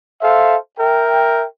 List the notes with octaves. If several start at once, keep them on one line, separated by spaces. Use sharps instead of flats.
A4 C5 E5 F5
A#4 E5 G5